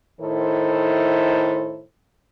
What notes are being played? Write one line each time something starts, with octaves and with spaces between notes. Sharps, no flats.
A2 D#3 E4 A4 C5